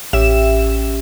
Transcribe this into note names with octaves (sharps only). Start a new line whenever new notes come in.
A1 C#4 G4 E5 E7